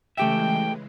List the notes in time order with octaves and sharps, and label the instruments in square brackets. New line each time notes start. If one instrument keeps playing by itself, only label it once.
[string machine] C#3 E3 G#3 [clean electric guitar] A3 G4 E5 [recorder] G5